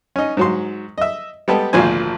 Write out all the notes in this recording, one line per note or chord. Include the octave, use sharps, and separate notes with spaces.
C#4 D#4
G#2 F#3 C6
D#5 E5
G3 G#3 B3 G4 A4
G#1 D2 A#2 F3 C5 G#5